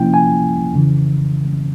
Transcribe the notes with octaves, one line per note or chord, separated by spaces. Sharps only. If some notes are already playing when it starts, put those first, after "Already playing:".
Already playing: C3 F3 A#3 C#4 E4 G5
G#5
F2 C#3 E3